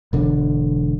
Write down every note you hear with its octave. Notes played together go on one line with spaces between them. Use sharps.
E1 D3